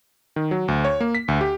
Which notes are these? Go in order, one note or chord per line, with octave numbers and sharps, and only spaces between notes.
D#3
F#3
D2
C#5
A#3
B6
D2
G4